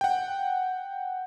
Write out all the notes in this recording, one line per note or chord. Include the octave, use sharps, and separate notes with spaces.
F#5 G5